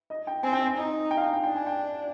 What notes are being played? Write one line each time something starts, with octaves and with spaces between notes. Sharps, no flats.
D#5
G5
C4 G#5
G5
G#5
D#4
G5
F5
G5
G5
D4 G5
G#5
G5